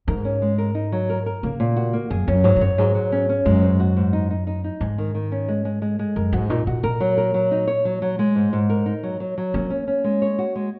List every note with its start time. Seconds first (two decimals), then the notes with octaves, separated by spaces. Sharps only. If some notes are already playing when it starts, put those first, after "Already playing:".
0.08 G#2 A#4
0.25 C#4
0.42 G#3
0.58 A#4
0.75 D#4
0.92 F#3
1.10 A#4
1.26 A#4
1.43 C#3 A#3
1.60 A#2
1.76 F#4
1.93 A#3
2.10 F#2 G#4
2.27 F#2 C#4
2.44 G#2 F#3
2.56 G#2
2.61 F#2 C#5
2.78 G#2 F#3
2.95 F#3
3.12 C#4
3.29 C#4
3.45 F#2 G#3
3.62 G#2
3.80 F#4
3.97 G#2
4.13 D#4
4.31 D#4
4.47 D#4
4.64 D#4
4.80 G#2 G#3
4.98 D#3
5.14 D#3
5.32 C#4
5.48 G#3
5.65 G#3
5.82 G#3
5.99 G#3
6.16 F#2 A#4
6.33 G#2 F#4
6.50 A#2 D#4
6.67 A#2 F#4
6.83 A#2 A#4
7.00 F#3
7.17 A#4
7.34 F#3
7.51 D#4
7.67 C#5
7.85 F#3
8.02 F#3
8.19 G#3
8.36 G#2
8.53 G#2
8.69 A#4
8.86 D#4
9.03 F#3
9.20 F#3
9.38 F#3
9.54 A#3 C#4
9.70 C#4
9.87 C#4
10.04 G#3
10.22 C#5
10.38 F#4
10.55 G#3